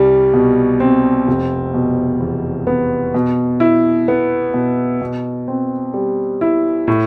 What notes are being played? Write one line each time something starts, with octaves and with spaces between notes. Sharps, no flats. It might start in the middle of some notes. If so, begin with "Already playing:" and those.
Already playing: C2 G3
B2
C4
F1
B2
E2
B3
B2
E4
B3
B2
B2
C4
G3
E4
A2